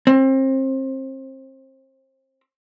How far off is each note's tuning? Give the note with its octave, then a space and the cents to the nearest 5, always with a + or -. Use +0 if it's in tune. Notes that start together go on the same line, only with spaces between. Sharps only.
C4 +30